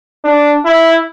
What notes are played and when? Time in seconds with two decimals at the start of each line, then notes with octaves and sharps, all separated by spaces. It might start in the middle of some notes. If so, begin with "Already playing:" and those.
0.24 D4
0.65 E4